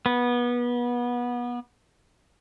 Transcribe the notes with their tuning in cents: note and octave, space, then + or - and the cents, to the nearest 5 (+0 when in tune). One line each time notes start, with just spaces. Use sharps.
B3 -25